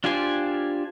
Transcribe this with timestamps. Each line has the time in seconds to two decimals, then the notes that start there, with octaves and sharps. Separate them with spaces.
0.04 D4 F4 G4 C5 G#5